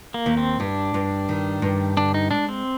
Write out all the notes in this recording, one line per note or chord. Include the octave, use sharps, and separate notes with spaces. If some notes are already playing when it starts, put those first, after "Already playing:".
A#3
D#2
C4
G2 D4
G2
D#3
G2
D3 D4
D#4
G#3 D4
C4